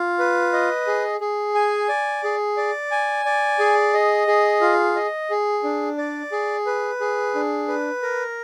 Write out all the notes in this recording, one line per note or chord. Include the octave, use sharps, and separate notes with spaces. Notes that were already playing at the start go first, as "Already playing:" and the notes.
Already playing: F4
B4
D#5
G#4
G#4
G#5
D5
G#4
D5
G#5
D5
G#4
D#5
G#4
F4
D#5
G#4
D4
D5
G#4
B4
G#4
D4
B4
A#4